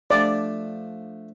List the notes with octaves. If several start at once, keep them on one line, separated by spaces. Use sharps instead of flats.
F3 A3 D4 D5